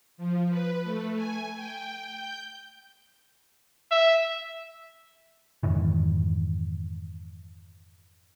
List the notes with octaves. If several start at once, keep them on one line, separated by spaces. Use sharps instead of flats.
F3
B4
A3
G#5
G5
G6
E5
F2 G#2 D#3 E3